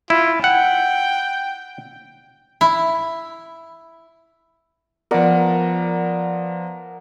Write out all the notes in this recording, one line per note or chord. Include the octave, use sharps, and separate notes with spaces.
E4 F4
F#5 G5
E4
F3 B3 A#4 D5 F#5